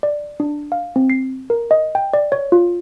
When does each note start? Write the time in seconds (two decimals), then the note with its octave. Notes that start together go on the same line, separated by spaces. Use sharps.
0.03 D5
0.40 D4
0.72 F5
0.96 C4
1.10 C7
1.50 A#4
1.71 D#5
1.95 G5
2.13 D5
2.32 C#5
2.52 F4